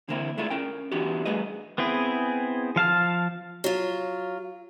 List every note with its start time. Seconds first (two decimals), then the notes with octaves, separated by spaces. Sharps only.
0.09 D3 E3 A#3 C4 E4
0.38 G#3 A3 D4 E4 F4
0.50 C#4 A#4 G5
0.92 E3 B3 D4 E4 F#4 G4
1.25 G3 A3 G#4 B4 D#5
1.78 B3 C4 E4 G#4
2.76 F3 F5 A5 F6
3.64 F#3 F4